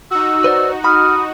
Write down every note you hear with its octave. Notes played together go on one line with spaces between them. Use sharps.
D#4 F#4 E6
B4 C5 D5
B5 D#6 F6